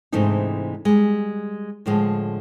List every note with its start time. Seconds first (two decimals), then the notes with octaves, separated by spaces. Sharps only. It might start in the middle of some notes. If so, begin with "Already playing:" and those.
0.12 G#2 C3 E3 A3 D4 D#4
0.85 G3 G#3
1.86 A2 D3 F3 G#3